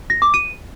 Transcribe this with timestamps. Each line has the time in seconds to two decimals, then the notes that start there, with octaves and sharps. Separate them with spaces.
0.10 A#6
0.22 D6
0.34 D#7